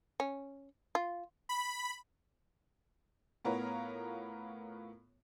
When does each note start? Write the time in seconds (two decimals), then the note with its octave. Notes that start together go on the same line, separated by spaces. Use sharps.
0.20 C#4
0.95 F4
1.49 B5
3.45 A2 B3 F4 A#4 C#5